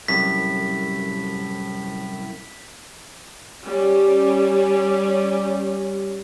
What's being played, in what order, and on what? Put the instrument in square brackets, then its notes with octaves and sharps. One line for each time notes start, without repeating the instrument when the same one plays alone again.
[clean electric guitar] C2 F#2 A2 [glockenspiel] B6
[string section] G3 C#4